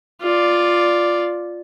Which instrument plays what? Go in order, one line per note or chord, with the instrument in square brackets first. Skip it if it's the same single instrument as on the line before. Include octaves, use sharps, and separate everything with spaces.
[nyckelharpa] F4 D5